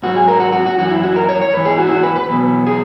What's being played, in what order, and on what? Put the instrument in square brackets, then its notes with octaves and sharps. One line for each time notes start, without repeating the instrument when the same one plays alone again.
[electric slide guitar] G#2 F#3 F#4
G#4
A#4
F#4
F#4
F#4
F#2 E3 F#4
E4
F#4
A#4
C#5
C#5
G#2 E3 B4
G#4
F#4
E4
F#4
B4
B4
E2 B2 F#3
G#4